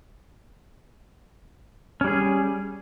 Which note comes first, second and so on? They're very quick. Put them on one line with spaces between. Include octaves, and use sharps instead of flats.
C#4 G3 G#4